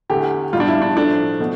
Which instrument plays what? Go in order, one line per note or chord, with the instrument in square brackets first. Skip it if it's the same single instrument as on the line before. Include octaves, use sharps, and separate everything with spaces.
[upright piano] E2 D3 A3 G4
B2 G3 F4
D4
E4
D4
A2 F3 A3 D4
B2 A3